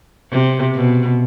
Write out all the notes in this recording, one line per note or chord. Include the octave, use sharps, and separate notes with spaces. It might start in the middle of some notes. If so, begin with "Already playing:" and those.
C3
B2